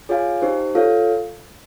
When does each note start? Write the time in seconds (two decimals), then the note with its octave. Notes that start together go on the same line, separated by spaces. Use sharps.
0.09 F4 G#4 C#5 F5 G#5
0.42 D#4 G4 C5
0.75 F4 A4 C#5 F5